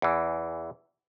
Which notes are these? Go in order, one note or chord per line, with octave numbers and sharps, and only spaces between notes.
E2 E3